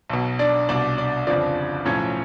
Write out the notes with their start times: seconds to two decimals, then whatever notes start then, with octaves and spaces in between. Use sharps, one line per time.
0.10 B1 B2
0.39 D4 D5
0.69 C2 B2 D4 D5
0.98 D4 D5
1.27 G1 F2 C#3 F3 D4 D5
1.85 B1 A2 F3 C#4 C#5